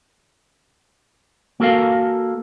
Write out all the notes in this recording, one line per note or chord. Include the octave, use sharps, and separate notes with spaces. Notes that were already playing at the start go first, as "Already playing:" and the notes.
A#3 F#4 A4 A#4 F5